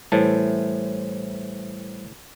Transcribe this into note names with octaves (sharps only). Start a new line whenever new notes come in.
A2 E3 G3 C5 A5